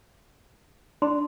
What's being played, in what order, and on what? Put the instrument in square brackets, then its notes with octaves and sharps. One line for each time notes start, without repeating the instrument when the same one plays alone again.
[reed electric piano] D4 [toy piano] C6